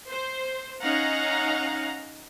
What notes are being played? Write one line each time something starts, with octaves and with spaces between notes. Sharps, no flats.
C5
C#4 D#4 F5 F#5 A#5